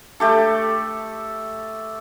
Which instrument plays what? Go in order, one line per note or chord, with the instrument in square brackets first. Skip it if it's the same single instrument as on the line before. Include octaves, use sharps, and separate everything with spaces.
[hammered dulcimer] A3 G4 A4